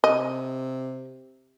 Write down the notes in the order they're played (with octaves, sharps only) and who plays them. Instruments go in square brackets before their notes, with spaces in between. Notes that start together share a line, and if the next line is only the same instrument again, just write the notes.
[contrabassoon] C3 [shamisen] D#5